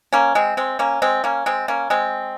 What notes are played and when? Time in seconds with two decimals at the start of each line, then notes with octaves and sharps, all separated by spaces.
0.13 A#3 C#4
0.35 G#3 C4
0.57 G#3 C4
0.79 A#3 C#4
1.02 G#3 C4
1.24 A#3 C#4
1.46 G#3 C4
1.68 A#3 C#4
1.90 G#3 C4